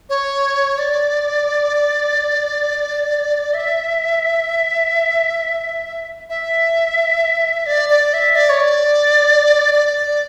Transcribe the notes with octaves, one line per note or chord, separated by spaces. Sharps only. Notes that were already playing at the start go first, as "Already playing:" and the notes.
C#5
D5
E5
E5
D5
D5
E5
D5
C#5
D5
D5
D5